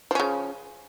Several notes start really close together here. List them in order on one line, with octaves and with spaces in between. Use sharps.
F3 C#4 C#3